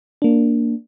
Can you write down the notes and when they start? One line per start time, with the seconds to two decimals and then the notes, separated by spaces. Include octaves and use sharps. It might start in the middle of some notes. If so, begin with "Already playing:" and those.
0.22 A#3 D4